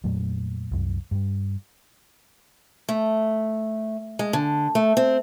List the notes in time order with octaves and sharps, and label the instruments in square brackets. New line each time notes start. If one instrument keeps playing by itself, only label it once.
[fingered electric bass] F2 A#2 F#3 A3
C2 F#2
G2 G3
[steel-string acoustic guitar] A3
G#3
D3
A3
C4